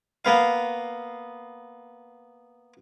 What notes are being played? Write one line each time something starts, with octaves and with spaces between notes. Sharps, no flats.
A#3 B3 F5